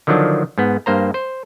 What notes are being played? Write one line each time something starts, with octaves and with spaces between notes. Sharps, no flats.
D3 D#3 F3 F#3 D4
G#2 B3
G2 A#3 C5 A#5
C5